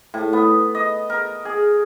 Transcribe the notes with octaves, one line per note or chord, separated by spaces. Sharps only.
A2
B3
D#5
A#4
G#4